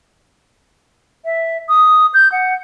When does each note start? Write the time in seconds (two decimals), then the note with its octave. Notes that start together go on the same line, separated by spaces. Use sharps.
1.25 E5
1.69 D#6
2.14 G6
2.32 F#5